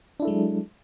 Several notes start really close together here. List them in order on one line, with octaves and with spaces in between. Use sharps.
D4 E4 A4 G#3 F#3